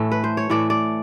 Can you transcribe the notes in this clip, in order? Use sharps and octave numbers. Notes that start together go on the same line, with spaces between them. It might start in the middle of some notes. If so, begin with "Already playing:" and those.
Already playing: A2 E3 A3
B4
C5
C#5
A2 E3 A3 D5
D5